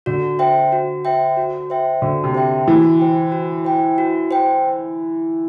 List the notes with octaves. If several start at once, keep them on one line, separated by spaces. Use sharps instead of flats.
D3 F#4
C5 E5 G5
F#4
C5 E5 G5
F#4
C5 E5 G5
D3 F#4
C3
C5 E5 G5
E3 F#4
C5 G5
F#4
C5 G5
F#4
C5 G5